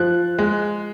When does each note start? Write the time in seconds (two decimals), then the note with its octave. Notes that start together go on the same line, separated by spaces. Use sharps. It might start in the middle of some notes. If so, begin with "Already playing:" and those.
Already playing: F3 F#6
0.39 G#3